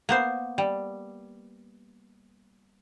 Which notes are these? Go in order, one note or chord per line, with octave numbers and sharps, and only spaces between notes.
A#3 B3 C5
G3